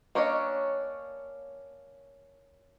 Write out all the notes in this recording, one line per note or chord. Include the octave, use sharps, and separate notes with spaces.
A#3 C#4 D4 C#5 D#5